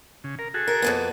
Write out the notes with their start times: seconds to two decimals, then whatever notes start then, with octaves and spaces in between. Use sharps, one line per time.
0.24 C#3
0.39 A#4
0.54 F#4 G#4 A4
0.68 A#4
0.82 F2 A#3 B3